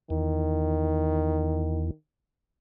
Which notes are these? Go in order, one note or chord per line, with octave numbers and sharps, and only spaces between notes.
E2 D#3